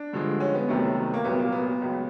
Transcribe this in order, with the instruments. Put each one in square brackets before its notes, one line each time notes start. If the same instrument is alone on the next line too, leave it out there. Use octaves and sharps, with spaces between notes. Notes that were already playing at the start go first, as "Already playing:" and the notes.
Already playing: [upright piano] D4
G2 D3 F3 G#3
C#4
B3
C2 C3 D#3 F#3 A3
A#3
C2 A#2 F#3 B3
A#3
B3
C#2 C#3 F#3